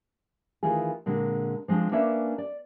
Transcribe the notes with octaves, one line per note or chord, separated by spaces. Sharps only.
D#3 E3 A3 F4 G#4
A#2 D3 G#3 C4
F3 G#3 C4 D4 F4
A#3 C#4 D4 B4 D5 E5
D5